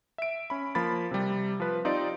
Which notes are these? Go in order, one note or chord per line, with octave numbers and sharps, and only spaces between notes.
E5 D7
C#4 B5
F3 A#3 B5 A6
C3 G3
F3 B4
C4 D#4 F4 G4 D5